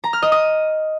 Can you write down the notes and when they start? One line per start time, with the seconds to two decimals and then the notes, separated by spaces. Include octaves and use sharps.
0.04 A#5
0.13 F6
0.22 D#5
0.32 D#6